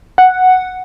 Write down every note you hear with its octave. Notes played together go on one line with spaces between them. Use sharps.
F#5